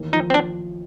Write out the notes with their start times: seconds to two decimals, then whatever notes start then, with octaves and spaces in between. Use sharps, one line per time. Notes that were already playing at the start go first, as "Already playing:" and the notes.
Already playing: A1 D#2
0.12 F3 D#4
0.30 C4
0.34 D4